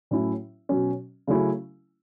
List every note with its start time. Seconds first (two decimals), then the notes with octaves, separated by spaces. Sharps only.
0.11 A2 F#3 C#4 E4
0.69 B2 F#3 C#4
1.27 C#3 F#3 A3 C#4 E4